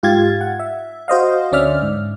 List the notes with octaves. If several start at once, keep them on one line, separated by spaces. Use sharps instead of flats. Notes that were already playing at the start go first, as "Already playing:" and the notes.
G#2 F4 G4 F5 G#6 A6
F#5
E5
F#4 C5 D#5 F5
D2 D3 C#4 D5 E5 F6
G#2